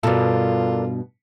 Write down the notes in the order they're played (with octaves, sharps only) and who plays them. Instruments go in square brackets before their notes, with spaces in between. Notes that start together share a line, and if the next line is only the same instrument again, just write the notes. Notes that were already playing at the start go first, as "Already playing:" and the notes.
[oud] G2 B2 [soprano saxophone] F4 [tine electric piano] A4 A#4 D5